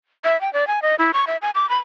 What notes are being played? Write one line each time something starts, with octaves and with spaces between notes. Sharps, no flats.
E5
G5
D5
G#5
D#5
E4
C#6
E5
G#5
D6
B5